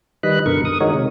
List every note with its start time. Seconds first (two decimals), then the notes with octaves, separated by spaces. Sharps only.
0.23 D#3 G3 B4 D#5 B5 F#6
0.46 F#2 B2 D3 A#4 C#6
0.65 D#6
0.81 D#3 G#3 D#4 F#4 A#4 C#5
0.94 C3 G#3